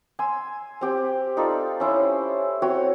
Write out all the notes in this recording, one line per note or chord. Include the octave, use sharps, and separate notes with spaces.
G#5 C6 E6
C4 G4 G5
D#4 F4 A4 D5
C#4 E4 C5
C4 F#4 C#5 G5